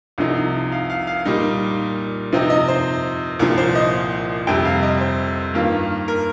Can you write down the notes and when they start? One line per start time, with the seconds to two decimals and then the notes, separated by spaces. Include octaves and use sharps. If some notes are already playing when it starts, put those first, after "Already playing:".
0.18 C2 C3 F3 D#4
0.72 F5
0.90 F5
1.07 F5
1.25 A#2 G3 D#4
2.32 C3 F3 C4 D#4
2.50 D#5
2.68 C5
3.39 C2 A#2 F3 A#4
3.58 C5
3.75 D#5
4.47 F2 C3 G3 G5
4.65 F5
4.83 D#5
5.01 C5
5.54 G2 D#3 A#3 F4
6.08 A#4